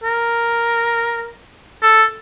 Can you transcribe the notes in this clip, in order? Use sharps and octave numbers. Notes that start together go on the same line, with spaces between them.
A#4
A4